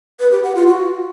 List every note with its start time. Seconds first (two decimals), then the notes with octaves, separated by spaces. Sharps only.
0.20 B4
0.31 G4
0.43 F#5
0.55 F4
0.67 F#4